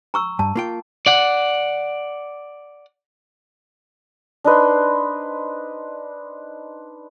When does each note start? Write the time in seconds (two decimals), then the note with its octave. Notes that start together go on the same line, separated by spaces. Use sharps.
0.14 A#5 C#6 E6
0.39 G2 A5
0.56 A#3 F4 G5
1.06 D5 F#5
4.44 D4 D#4 B4 C5